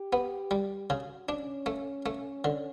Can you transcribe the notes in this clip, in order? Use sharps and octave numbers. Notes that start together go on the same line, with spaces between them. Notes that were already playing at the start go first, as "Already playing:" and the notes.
Already playing: G4
B3
G3
C#3 F#4
C#4 D4
A3
A3
D3